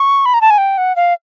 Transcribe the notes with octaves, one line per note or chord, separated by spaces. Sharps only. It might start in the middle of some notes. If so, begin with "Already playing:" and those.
Already playing: C#6
B5
A#5
A5
G#5
G5
F#5
F5